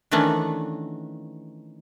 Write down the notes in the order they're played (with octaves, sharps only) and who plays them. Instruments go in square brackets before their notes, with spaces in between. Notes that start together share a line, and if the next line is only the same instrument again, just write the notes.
[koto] D#3 E3 A3 C#4 D4 F#4